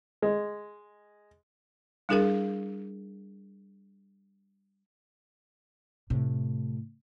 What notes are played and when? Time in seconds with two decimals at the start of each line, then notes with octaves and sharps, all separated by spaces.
0.22 G#3
2.09 G3 D4 E4 G#4 A#4 F5
6.10 A2 C3